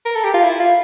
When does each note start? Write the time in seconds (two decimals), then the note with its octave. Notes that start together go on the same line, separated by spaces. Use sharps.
0.06 A#4
0.16 A4
0.24 G4
0.34 F4
0.44 E4
0.60 F4